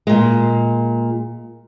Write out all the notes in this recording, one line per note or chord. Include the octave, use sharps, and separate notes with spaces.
A#2 G#3